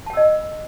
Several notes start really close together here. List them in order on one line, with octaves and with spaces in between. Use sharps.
A5 G5 E6 D#5